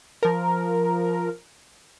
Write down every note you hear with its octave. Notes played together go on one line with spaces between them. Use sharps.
F3 A#4